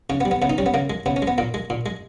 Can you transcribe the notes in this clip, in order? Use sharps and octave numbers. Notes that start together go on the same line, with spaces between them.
C#3 C#4
B3
G3
B3
C#3 B3
D#4
G3 C#4
B3
C#3 A#3
G#3
C#3 B3
C#4
G#3
B3
A#2 A#3
G#3
A#2
G#3